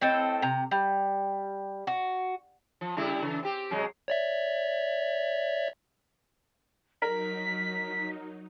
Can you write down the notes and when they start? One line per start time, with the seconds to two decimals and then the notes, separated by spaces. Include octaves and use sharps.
0.01 A2 C4 A4 D#5
0.42 C3 A#5
0.71 G3
1.87 F#4
2.81 F3
2.97 C#3 G3 E4
3.22 C#3 E3
3.43 C4 G4
3.71 C3 F#3 G#3
4.08 C#5 D5 E5
7.02 F#3 D#4 A#4 B6